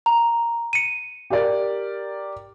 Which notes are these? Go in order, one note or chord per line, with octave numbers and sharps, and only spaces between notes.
A#5
C#7 D#7
G4 A#4 D5